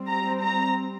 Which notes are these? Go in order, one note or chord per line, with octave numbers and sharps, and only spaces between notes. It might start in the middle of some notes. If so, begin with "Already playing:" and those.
Already playing: G3 C4
A#5
A#5